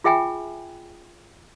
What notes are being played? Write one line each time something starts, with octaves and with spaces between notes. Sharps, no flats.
F4 G#4 E5 G5 G#5 B5